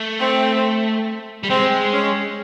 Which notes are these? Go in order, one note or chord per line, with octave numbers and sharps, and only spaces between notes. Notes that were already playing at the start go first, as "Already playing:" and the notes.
Already playing: A3
C4
G3
G#3 C4
C#4